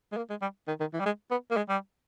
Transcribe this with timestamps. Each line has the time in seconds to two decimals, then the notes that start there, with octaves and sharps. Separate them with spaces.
0.12 G#3
0.17 A#3
0.30 G#3
0.42 G3
0.68 D#3
0.80 D#3
0.93 E3
1.00 G3
1.06 G#3
1.31 B3
1.51 A#3
1.57 G#3
1.69 G3